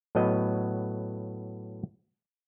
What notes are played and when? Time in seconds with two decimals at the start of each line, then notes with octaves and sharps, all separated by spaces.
0.15 A2 F#3 B3 D#5